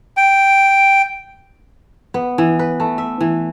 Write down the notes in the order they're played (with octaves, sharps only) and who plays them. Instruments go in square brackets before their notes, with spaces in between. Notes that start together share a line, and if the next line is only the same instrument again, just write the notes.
[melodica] G5
[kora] B3
E3
B4
A3
E5
E3